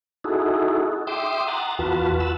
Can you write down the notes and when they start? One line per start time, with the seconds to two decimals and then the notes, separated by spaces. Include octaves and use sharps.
0.24 D#4 E4 F#4 G#4 A4
1.07 E5 G5 C6 D6 D#6
1.48 F#5 A#5 A6
1.79 E2 F4 F#4 B4 A5
2.20 F#5 A5 E6